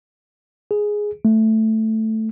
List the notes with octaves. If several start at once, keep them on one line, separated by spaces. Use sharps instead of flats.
G#4
A3